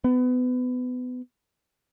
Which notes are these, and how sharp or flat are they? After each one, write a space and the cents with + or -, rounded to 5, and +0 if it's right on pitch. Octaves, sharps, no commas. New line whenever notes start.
B3 +25